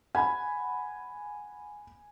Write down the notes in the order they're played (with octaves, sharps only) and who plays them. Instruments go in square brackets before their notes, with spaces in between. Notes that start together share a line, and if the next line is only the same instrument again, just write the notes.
[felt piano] F#5 B5 [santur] G#5